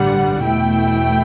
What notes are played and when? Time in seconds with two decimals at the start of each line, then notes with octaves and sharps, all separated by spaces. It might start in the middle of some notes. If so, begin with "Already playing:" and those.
Already playing: A1 G2 D3 G3 F#5
0.42 E2 B2 A3 E4 G5